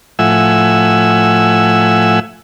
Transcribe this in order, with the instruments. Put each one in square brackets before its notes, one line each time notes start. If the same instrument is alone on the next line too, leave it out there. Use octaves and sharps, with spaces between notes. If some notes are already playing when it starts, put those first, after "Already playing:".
[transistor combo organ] A2 F3 E5 F#5 G#5 E6